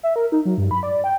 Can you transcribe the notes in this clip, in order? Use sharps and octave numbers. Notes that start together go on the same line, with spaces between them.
E5
A#4
D#4
F#3
G2
B5
D5
G5